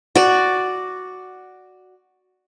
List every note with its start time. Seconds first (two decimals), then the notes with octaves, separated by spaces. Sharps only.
0.16 F#4 D5